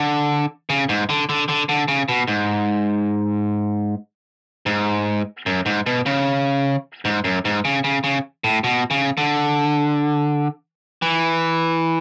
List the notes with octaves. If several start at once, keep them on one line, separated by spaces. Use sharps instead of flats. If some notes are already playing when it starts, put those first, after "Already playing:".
Already playing: D3
C#3
G#2
D3
D3
D3
D3
C#3
B2
G#2
G#2
F#2
G#2
B2
C#3
G#2
F#2
G#2
C#3
C#3
C#3
A2
B2
C#3
D3
E3